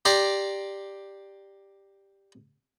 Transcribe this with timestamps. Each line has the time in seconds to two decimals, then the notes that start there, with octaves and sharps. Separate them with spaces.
0.05 G4 D5 A#5 C6 D6